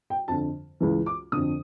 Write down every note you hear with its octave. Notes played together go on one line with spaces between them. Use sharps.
G5
F2 D3 A5
C#2 C#3 E3
D6
F2 D3 D#6